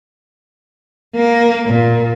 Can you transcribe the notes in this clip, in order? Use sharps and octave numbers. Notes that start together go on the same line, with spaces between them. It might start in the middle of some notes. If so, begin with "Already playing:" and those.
A#3
A#2